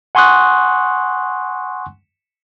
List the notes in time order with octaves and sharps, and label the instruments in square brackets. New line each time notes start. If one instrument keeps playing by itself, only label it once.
[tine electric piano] F#5 G#5 C6 C#6 D#6 F#6